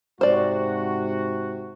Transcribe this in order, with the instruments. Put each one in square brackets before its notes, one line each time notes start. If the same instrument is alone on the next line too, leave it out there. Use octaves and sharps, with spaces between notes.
[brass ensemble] G#2 C3 F#4 [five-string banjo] C5 D5